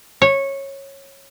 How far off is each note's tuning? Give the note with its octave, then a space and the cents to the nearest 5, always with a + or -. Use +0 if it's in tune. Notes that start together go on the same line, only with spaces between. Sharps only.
C#5 -15